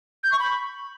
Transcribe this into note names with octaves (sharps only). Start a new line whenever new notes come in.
G6
C#6
B5